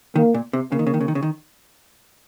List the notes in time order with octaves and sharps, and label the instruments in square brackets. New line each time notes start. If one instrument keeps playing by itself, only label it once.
[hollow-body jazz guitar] D#3 [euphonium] A#3
[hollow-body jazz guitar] A#2
C3
[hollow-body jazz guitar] C#3 [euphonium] A#3
[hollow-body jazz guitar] D#3
C#3
D#3
C#3
D#3
C#3
D#3